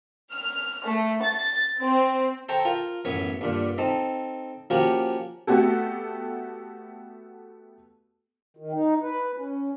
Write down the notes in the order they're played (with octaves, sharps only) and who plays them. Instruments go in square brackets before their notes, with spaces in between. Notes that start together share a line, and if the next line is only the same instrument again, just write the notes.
[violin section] F6
A3
A6
C4
[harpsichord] A4 C5 G5 A#5 C#6
F4 A#4
A1 F#2 B3 C#5
G2 A#2 D3
C4 D#4 A4
F3 A#3 C#4 F#4 G4 A#4
[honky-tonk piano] A3 B3 F#4 G4 A4
[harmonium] D#3
D#4
B4
C#4